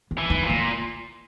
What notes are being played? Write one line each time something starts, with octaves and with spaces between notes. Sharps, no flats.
B3
E3
D#4
A#2
A#3